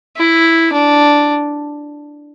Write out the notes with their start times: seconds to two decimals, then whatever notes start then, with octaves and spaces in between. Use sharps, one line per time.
0.17 E4
0.72 D4